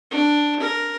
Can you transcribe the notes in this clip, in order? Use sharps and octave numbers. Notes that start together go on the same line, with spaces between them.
D4
A#4